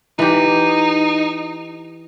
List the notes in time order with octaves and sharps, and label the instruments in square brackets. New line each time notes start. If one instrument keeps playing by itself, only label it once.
[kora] E3 G4 [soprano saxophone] D#4